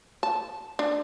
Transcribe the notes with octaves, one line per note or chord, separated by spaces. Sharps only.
A5
D4